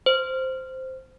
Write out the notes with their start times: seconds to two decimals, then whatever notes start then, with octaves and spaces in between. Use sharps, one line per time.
0.06 C5